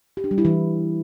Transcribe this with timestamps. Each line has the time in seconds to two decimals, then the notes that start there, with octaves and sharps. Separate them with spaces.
0.17 G4
0.24 D4
0.31 G3
0.38 E4
0.45 E3